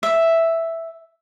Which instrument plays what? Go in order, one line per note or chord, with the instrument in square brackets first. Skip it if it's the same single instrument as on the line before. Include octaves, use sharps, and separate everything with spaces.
[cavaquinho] E5